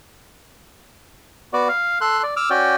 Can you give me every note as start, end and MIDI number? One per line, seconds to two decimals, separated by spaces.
1.53 1.68 59
1.53 1.68 66
1.53 1.68 74
1.69 1.98 77
2.01 2.22 69
2.01 2.22 84
2.01 2.22 90
2.23 2.34 74
2.37 2.49 86
2.37 2.49 88
2.37 2.49 89
2.50 2.76 61
2.50 2.76 66
2.50 2.76 74
2.50 2.76 79